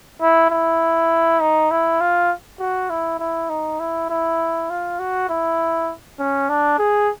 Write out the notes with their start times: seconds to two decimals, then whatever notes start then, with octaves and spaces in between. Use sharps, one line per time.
0.21 E4
0.51 E4
1.41 D#4
1.71 E4
2.01 F4
2.60 F#4
2.90 E4
3.19 E4
3.50 D#4
3.80 E4
4.10 E4
4.70 F4
4.99 F#4
5.29 E4
6.19 C#4
6.49 D4
6.79 G#4